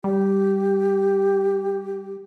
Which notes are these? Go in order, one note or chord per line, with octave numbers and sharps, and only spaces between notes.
G3 G4